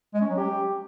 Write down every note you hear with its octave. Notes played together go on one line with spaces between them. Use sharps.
G#3
C#4
F#3
G4